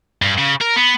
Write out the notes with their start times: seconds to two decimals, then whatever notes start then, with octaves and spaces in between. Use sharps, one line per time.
0.22 G2
0.38 C#3
0.61 A#4
0.76 B3